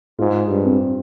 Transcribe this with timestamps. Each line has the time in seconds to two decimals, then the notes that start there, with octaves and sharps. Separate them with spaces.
0.19 G#2 F4
0.50 G2
0.65 C4